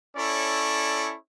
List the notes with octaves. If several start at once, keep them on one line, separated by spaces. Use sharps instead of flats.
C#4 E4 A4 C#5 D5